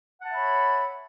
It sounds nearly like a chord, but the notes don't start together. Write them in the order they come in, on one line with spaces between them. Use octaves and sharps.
F#5 A5 E5 B5 C#5